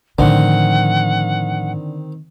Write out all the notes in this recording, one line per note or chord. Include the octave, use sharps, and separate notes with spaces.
A2 D3 D#3 F3 C4 F#5